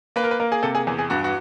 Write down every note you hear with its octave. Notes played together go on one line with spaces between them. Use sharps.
A#3 B4
A#4
B4
A#3 A#4
G#4
C3 A4
G#4
E2 G#4
G#4
G2 F#4
F#4